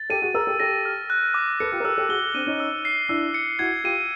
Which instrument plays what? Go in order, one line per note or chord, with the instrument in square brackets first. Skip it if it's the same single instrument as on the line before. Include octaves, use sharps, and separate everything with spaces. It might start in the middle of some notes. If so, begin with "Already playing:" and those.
Already playing: [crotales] A6
[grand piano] G4 A4 [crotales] D#7
[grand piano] F#4 G#4
[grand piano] G#4 A#4 [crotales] E6
[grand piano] G4 A4
[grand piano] G4 A4 [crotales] A#6
[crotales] F6
F#6
D6
[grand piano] A4 B4 [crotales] C#7
[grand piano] F4 G4
A#4
[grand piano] G4 A4 [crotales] E6
[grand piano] G4 A4
[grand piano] F#4 G#4 [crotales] G7
[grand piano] C4 D4 [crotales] D#7
[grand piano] C#4 D#4
[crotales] E6
C7
[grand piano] D4 E4 [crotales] E6
[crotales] C#7
[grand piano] E4 F#4 [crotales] G#6
[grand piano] F4 G4 [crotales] D#7